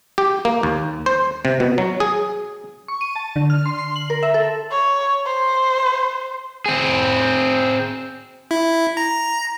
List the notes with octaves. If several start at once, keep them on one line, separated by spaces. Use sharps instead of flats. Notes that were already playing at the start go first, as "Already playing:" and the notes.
G4
A#3
D#2
C5
C3
B2
F#3
G#4
C#6
D#7
A5
D3
F6
C6
C7
F#7
A#4
E5
A4
C#5
C5
C4 G#4
E4
A#5